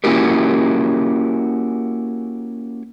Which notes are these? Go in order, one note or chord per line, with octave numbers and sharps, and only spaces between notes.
A#3 C#4 E4 F#4 G4 A#4